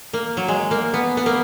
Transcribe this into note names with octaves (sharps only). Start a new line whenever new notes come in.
A#3
F#3
G#3
A#3
B3
B3
A#3